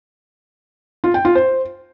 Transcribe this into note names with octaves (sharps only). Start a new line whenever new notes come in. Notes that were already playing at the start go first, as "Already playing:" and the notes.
F4
G5
F4
C5